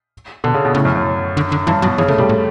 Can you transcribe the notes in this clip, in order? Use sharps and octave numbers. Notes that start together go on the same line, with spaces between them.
B2 D3
C#3
B2
A2 C#3
F#2
F#2
D3
D3
G2 E3
B2 F#3
C#3 E3
C#3 A3
B2 G3
A2